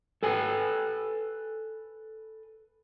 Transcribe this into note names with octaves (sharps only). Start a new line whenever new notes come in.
A4 B4 G#5